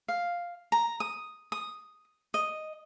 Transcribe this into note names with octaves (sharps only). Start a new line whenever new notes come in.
F5
A#5
D#6
D#6
D#5